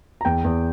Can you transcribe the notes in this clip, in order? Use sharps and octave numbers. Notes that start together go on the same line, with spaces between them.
A#5
E2 G5
E2